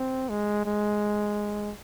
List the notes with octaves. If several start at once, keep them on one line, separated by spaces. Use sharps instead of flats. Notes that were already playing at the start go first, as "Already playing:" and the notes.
Already playing: C4
G#3
G#3